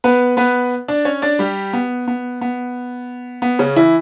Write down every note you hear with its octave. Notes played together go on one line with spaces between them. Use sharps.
B3 B4
B3 B4
D4 D5
C#4 C#5
D4 D5
G3 G4
B3
B3
B3
B3
C#3 C#4
E3 E4